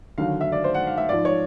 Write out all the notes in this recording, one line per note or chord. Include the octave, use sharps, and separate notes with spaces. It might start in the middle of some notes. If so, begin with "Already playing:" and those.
D#2 D3 F#3 F5
E5
D5
C5
F#5
F5
E5
G#2 F3 D5
C#5